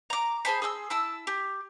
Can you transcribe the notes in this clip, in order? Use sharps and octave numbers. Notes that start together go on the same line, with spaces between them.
A#5 D6
G#4 C5 A5 B5
G#4 C6 D#6 E6
E4 A5 E6
G4